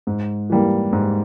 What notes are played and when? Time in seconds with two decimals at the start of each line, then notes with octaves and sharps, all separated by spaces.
0.07 G#2
0.50 E3 G3 A#3
0.93 G#2